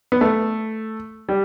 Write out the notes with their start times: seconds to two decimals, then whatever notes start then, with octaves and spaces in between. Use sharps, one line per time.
0.12 B3
0.21 A3
1.29 G3